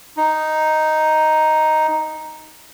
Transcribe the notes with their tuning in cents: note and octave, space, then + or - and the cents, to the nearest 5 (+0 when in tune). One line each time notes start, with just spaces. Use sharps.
D#4 +0